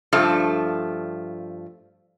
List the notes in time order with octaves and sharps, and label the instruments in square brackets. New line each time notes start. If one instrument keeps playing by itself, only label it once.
[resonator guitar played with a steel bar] G2 F3 A3